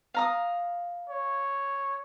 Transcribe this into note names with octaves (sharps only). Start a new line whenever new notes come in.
F5 A#5 D#6
C#5